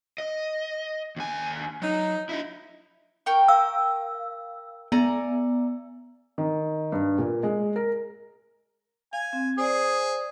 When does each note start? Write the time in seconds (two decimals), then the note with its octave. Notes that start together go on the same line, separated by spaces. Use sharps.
0.18 D#5
1.16 D#2 G#5
1.82 F#3 D#4
2.29 E4 D#5
3.26 A#4 G5 C#6
3.48 F5 E6
4.92 B3 D5 G#5 A#5
6.38 D#3
6.92 G2
7.18 A#2
7.43 G#3
7.76 A#4
9.13 F5 G#5
9.33 C4
9.58 G#4 C5 D5